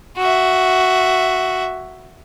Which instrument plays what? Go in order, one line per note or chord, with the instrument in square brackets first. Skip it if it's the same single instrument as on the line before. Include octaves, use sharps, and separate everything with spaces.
[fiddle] F#4 E5